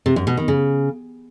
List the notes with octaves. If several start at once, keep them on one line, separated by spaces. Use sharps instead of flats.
C3
F#2
B2
D#3
C#3